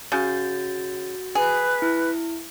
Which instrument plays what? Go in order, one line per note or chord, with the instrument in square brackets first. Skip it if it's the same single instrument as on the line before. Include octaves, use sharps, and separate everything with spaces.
[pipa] C#3 [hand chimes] F#4 G6 A6
[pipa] G#4 [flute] B4
[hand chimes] E4